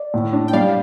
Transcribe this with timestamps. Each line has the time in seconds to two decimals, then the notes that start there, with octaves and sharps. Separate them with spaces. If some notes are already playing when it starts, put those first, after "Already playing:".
Already playing: D5
0.14 A2
0.33 D4
0.48 G5
0.53 G3 D5 F5